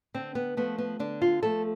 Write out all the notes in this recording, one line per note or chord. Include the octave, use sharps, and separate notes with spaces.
D3 C4
B3
F3 A3 B3
B3
D3 D4
F4
F3 A3 A4